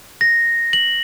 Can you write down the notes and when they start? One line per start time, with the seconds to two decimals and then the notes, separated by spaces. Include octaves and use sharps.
0.21 A#6
0.73 F#7